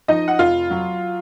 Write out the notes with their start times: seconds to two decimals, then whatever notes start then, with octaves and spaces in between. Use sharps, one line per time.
0.08 F3 D#4 D#5
0.28 F#5
0.39 F1 F4 F5
0.71 F#3